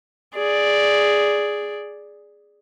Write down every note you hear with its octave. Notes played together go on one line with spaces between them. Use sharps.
G#4 D5